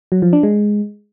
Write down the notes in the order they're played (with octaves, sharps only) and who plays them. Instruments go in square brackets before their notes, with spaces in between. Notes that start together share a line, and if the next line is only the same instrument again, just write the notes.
[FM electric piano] F#3
F3
D4
G#3